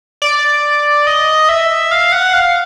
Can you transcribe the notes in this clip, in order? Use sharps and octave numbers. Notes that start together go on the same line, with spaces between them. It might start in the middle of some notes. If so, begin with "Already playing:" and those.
D5
D#5
E5
F5
F#5
F5